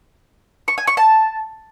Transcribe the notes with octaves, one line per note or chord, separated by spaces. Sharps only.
C#6
G#5
C#6
A5